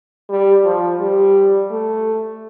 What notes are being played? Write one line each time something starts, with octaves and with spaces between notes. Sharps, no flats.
G3
F3
G3
A3